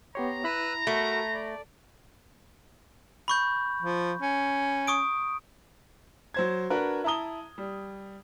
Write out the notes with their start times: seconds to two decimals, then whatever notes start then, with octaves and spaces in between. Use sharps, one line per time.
0.15 B3 G4 C#5 A#5 C6
0.44 E4 B4 B5 E6 F#6
0.87 A3 F#4 A4 A#4 B5
1.34 D5
3.28 B5 C#6 G6
3.82 F3
4.21 C#4
4.87 C#6 D#6 D7
6.34 F#3 C5 G#6
6.70 D4 F#4 A#4 B4
7.04 E4 A5 A#5 D#6 G7
7.58 G3